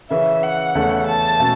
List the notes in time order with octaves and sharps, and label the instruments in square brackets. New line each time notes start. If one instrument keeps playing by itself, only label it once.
[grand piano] C#3 E3 C#4 [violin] E5
[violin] F#5
[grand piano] E2 C#3 A3 C#4 A4
[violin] A5
[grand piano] B2 A3 C#4